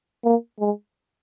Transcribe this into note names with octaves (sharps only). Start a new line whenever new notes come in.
A#3
G#3